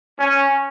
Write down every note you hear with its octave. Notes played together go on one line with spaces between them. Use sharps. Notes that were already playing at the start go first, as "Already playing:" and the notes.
C#4